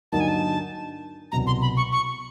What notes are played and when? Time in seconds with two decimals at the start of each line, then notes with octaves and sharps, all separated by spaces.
0.12 G2 D3 F#3 A#3 D#4 A5
0.20 G#5
0.28 A5
1.31 C2 B2 F#3 A#5
1.46 C6
1.61 B5
1.77 C#6
1.92 C#6